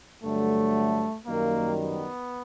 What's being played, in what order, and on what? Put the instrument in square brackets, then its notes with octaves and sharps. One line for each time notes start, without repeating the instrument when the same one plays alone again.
[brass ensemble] G2 D3 F#3 A3
F#2 D#3 G3 A#3
B3